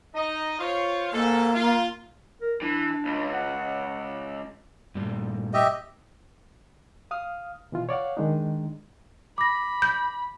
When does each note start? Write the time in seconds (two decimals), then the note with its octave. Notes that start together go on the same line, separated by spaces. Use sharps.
0.15 D#4 D#5
0.59 F4 C5 C#5
1.13 G#2 A#3 A4
1.53 F4
2.41 A#4
2.62 E3 D4
3.05 C#2
3.33 F#5
4.95 G2 A#2
5.54 G4 D#5 E5
7.11 F5 D#6 F6
7.72 B2 E3 F4
7.89 C#5 D5 F5 F#5
8.17 D#3 G#3 D4 D#4
9.38 B5 D6 A#6
9.82 G6